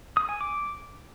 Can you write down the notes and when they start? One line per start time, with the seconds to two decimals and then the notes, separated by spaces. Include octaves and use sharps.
0.17 D#6
0.29 G#5
0.41 D6